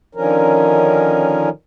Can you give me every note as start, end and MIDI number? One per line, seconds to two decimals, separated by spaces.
0.15 1.49 50
0.15 1.49 51
0.15 1.49 53
0.15 1.49 61
0.15 1.49 70